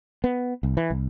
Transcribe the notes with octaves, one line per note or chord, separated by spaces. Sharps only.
B3
C2
E3
C2